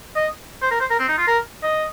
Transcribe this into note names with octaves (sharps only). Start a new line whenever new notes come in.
D#5
C5
A#4
C5
A#4
C4
D#4
F4
A#4
D#5